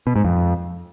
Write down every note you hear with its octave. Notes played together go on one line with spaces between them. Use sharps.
B2
G#2
F2